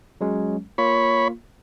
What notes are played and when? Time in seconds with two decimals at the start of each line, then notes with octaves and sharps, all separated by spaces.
0.21 F#3 G#3 C#4
0.78 A#3 F4 C#5 B5